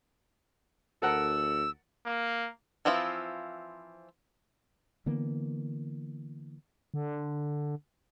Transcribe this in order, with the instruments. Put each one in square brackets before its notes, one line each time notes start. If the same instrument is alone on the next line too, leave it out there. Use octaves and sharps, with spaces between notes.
[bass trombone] D2 [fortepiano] A4 A#4 F#5 [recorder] E6
[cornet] A#3
[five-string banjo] E3 F3 C4 E4 F4
[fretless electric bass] D3 E3 A#3 B3
[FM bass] D3